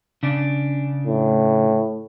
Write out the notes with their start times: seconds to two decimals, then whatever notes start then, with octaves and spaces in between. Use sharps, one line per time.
0.23 C#3 D4
1.06 A2